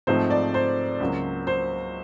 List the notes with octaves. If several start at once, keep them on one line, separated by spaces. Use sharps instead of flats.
G#2 F3 A3 C4 D#4 C5
D5
C5
C#2 C#3 F#3 A#3
C5